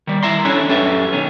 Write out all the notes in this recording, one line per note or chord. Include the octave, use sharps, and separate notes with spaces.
D#3 G3
E4 E5 A#5 C6
C#4 D4 E4 A4 C#5
F#2 C#4 G4 A4 B4 E5
B2 D#3 C#4